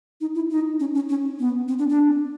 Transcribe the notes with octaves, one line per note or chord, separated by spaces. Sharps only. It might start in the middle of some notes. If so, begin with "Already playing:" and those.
D#4
E4
D#4
C#4
C#4
C#4
B3
C4
D4
D4